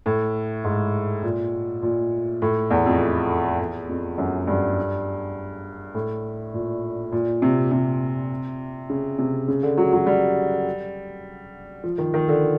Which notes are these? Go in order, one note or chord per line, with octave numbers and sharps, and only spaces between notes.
A2
G#2
A#2
A#2
A2
E2
F2
E2
F2
F#2
G2
A2
A#2
A#2
C3
C3
C#3
C3
C#3
D3
F#3
F#3
G3
F3
D#3
D#3
D3